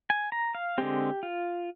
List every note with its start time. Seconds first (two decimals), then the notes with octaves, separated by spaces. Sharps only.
0.10 G#5
0.32 A#5
0.55 F5
0.78 D3 G#3 C4 G4
1.23 F4